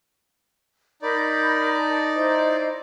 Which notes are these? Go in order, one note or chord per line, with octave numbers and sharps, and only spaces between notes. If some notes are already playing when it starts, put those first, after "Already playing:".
D#4 A#4 D5 B5 G6
A5
E4 C5 D#5